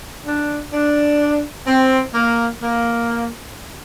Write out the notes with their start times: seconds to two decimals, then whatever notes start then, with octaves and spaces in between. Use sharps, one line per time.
0.26 D4
0.73 D4
1.67 C4
2.14 A#3
2.62 A#3